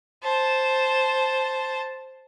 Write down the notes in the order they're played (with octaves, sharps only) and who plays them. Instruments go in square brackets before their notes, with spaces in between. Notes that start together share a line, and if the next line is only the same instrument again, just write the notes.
[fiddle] C5 A5